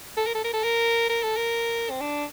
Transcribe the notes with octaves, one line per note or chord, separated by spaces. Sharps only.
A4
A#4
A4
A#4
A4
A#4
A#4
A4
A#4
C4
D4